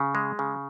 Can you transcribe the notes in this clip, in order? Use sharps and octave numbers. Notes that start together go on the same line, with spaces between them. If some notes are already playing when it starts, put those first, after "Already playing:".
Already playing: C#3
G#3
C#3